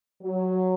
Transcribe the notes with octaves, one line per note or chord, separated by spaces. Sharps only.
F#3